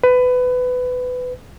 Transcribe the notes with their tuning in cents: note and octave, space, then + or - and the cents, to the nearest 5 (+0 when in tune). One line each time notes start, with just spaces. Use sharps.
B4 +20